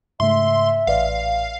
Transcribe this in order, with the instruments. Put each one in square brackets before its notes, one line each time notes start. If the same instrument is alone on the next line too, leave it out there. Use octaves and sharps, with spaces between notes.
[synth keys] G#2 C#3 A3 [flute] E5 [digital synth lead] C6
[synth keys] A1 B4 D5 [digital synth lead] F5